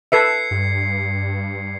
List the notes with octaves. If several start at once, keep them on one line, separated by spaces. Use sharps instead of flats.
A4 B4 E5 G#6 C7 C#7
G2